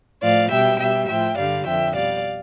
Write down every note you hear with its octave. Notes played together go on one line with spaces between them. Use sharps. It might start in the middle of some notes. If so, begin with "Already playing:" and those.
A2 F3 D5 F5
B2 G3 E5 G5
B2 G3 E5 G5
A2 F3 E5 G5
G2 D3 G3 D5 F5
F2 D3 F3 E5 G5
B2 G3 D5 F5